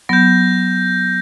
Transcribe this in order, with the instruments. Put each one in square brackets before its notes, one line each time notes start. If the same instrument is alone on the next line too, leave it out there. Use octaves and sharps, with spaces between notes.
[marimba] F#3 B3 [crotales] G6 A#6